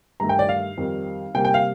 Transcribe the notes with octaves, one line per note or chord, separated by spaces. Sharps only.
G2 D#3 A3 A#5
G5
D5
F5
F2 D#3 G3
C3 G3 A#3 G5
G5
F5